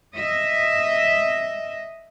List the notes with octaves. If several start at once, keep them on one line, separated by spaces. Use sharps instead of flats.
D#5 E5